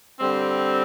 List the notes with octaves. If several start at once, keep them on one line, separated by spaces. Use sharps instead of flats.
D3 G3 C4